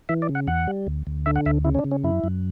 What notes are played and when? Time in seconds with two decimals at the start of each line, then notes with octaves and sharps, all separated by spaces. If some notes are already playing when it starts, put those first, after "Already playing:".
0.09 E3 E5
0.22 D5
0.29 C#3
0.35 F#5
0.47 E2 F#5
0.67 G3
0.87 D2
1.07 D2
1.26 D3 E5
1.36 F#5
1.46 D2 E5
1.65 C#3 E4
1.75 C#4
1.79 D4
1.84 C#3
1.91 C#4
2.04 F#2 E4
2.24 F#2